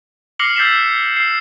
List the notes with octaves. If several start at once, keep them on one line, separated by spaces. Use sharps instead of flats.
D6 F6 A#6 C7 C#7 F#7
E6 G6 A6 B6 C7 E7
E6 C7